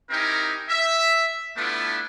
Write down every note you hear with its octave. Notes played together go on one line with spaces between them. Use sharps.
C4 D#4 E4 G4 A#4 G#5
E5
A3 B3 D4 E4 F4 B4